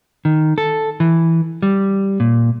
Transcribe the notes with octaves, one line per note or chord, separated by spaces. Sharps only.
D#3
A4
E3
G3
A#2